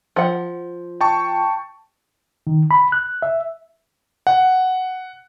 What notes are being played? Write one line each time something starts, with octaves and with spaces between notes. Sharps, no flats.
F3 F#5
G5 A5 C#6
D#3
B5
F#6
E5
F#5